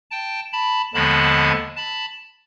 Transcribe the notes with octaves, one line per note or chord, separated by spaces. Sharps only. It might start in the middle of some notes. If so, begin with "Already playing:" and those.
G5 A5
A5 B5
D#2 D3 F3 G#3 B3 A5 B5
A5 B5